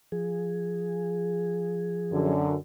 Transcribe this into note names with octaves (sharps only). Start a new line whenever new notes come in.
F3 G#4
F#2 D3